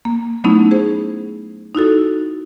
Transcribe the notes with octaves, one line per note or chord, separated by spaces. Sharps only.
A#3
F#3 A3 B3 C#4 D#4 E4
G#4 C5
D#4 E4 F#4 A4